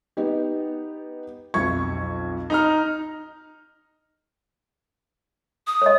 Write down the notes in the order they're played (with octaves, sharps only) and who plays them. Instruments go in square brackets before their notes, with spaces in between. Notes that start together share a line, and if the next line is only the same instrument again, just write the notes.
[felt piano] B3 D#4 G4
[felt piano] B1 F2 G#6 [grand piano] C#6
[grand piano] D#4 A#5 F6
[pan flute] D#6
[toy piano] C#5 D#5